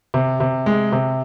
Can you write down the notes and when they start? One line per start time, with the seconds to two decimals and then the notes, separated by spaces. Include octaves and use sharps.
0.14 C3
0.40 C3
0.66 G#3
0.92 C3